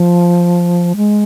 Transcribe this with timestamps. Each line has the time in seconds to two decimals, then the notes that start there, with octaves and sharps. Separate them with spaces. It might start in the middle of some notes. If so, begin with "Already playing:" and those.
Already playing: F3
0.96 G#3